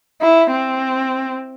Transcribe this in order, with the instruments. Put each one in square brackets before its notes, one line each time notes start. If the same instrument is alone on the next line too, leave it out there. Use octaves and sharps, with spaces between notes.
[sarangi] E4
C4